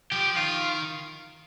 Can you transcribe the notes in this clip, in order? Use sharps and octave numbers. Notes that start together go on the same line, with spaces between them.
F3 G4
D#3 F4